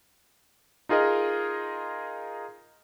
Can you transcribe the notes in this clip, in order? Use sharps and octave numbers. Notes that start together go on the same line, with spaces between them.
D#4 F4 G#4 A#4 D#5